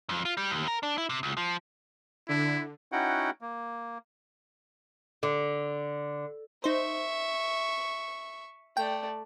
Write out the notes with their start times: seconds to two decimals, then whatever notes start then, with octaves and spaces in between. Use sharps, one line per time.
0.09 F2
0.25 F4
0.37 G3
0.51 D#2
0.68 A#4
0.83 D4
0.98 E4
1.10 C3
1.23 C#2
1.37 F3
2.29 D3 E4
2.92 C#4 D#4 E4 F#4 F#5 G5
3.41 A#3
5.23 D3
6.64 D#4 C5 E5 C#6
8.77 A3 D5 G5